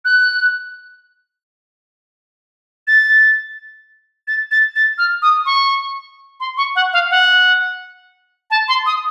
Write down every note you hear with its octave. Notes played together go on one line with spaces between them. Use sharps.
F#6
A6
A6
A6
A6
F6
D#6
C#6
C6
C#6
F#5
F5
F#5
A5
C6
D#6